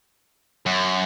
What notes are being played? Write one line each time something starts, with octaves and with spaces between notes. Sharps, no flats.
F#2